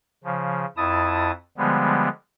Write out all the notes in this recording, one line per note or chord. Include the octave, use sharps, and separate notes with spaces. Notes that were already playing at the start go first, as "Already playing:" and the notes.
C#3 F3
F2 E4 A5 D#6
D3 F3 G3 G#3 B3